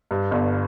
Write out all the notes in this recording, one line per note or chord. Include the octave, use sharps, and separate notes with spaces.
G2
G1